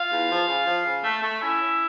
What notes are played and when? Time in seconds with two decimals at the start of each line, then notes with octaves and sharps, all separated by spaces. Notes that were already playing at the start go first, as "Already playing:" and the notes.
Already playing: F4 F5
0.10 E2
0.29 F3
0.47 C#3
0.66 F3
0.85 C#3
1.04 A3
1.22 A3
1.41 C#4 E4 E5
1.60 C#4